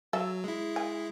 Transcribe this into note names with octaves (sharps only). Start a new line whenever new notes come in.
F#3 A4 E5
G#3 E4
G#5